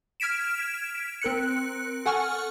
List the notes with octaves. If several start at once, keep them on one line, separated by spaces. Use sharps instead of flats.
F6 G#6 B6 D7 E7
C4 A#4 F#6 C#7
A4 F#5 G#5 C#6 F6